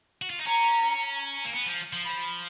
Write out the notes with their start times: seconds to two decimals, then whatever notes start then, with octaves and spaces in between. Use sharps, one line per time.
0.22 F#4
0.30 F4
0.39 D#4
0.47 C#4 A#5
1.45 A#3
1.53 B3
1.66 F3
1.93 F3
2.05 B5